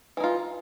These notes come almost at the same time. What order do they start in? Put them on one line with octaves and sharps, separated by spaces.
E3 D#4 F4